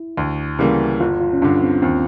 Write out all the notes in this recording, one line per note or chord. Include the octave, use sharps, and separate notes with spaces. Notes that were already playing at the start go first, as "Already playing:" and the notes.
Already playing: E4
D2
C#3 E3 G3 A#3
G1 F4
F4
C#4
G2 D3 D4
C4
D#2 C4